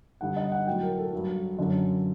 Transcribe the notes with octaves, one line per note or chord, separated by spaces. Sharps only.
G2 D3 G3 F#5
D#5
F#5
A2 F#3 G5
A#4
A4
G2 F#3
F#2 D3 F#3